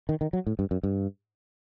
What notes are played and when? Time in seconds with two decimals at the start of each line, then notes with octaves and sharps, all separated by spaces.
0.09 D#3
0.21 D#3
0.33 F#3
0.47 A2
0.59 G2
0.71 F#2
0.83 G2